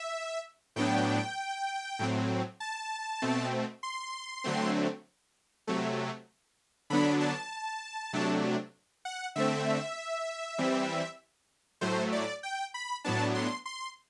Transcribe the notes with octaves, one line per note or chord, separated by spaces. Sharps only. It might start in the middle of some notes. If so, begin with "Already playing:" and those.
Already playing: E5
A2 F#3 B3 D4 G5
A2 F#3 C4
A5
B2 A3 C4
C6
D3 F#3 A3 C4
C3 F#3 A3
D3 F#3 B3 D4 B5
A5
C3 F#3 A3 D4
F#5
D3 A3 C4 E5
E3 G3 C4
A2 F#3 A3 C5
D5
G5
B5
A2 F#3 B3 D4 A5
C6
C6